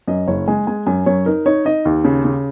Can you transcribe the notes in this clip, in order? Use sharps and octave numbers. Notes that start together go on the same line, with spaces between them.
F#2 D#5
F#1 C#5
G#3 G#5
G#3 G#5
F#2 G#5
F#2 C#5
D#4 A#4
D#4 C#5
D#4 D#5
D#2
C#3
C#3